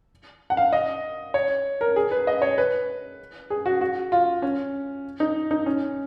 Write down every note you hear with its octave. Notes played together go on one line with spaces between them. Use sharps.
F#5
F5
D#5
C#5
A#4
G#4
B4
D#5
C#5
B4
G#4
F#4
F#4
F4
C#4
D#4
D#4
C#4